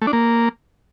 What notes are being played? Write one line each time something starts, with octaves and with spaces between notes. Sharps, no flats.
A3
D4
A#3